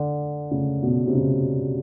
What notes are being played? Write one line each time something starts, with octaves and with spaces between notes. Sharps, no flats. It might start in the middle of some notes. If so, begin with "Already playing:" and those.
Already playing: D3
C#3
B2
C3
C#3